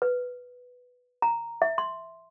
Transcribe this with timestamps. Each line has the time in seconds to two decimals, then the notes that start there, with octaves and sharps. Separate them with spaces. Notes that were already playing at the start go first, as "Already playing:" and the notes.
0.02 B4
1.22 A#5
1.62 E5
1.78 C6